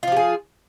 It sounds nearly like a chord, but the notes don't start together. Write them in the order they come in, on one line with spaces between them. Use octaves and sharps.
F4 F3 G4 G#4